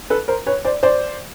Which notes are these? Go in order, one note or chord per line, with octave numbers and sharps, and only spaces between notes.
A4 B4
A#4 C5
B4 C#5
C5 D5
C5 D5